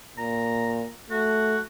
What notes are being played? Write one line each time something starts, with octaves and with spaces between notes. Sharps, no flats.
A#2 A#5
A3 F#4